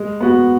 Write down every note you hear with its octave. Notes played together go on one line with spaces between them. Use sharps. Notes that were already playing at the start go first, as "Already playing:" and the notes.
Already playing: G#3
B3 F#4